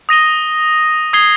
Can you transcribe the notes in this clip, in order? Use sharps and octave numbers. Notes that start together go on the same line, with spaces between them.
D#6 A#6 D#7 G7
D#6 G#6 C7 G7